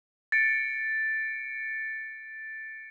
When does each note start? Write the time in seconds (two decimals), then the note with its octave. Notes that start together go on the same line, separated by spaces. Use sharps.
0.32 A6 C#7 D7